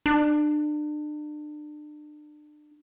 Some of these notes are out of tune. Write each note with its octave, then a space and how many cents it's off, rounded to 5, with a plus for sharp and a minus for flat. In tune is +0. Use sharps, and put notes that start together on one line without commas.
D4 +35